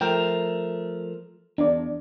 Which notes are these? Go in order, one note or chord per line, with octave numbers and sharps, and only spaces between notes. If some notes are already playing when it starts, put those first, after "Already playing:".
F3 A3 A#4 G5
E2 D4 D5